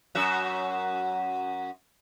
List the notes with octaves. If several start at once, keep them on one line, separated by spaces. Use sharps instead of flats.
F#2 F#4 E5